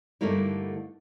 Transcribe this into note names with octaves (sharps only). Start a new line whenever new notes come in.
G2 D3 A3 A#3 D#4 E4